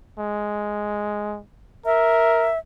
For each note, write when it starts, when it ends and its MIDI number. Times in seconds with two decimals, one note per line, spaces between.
0.18 1.40 56
1.86 2.51 70
1.86 2.59 76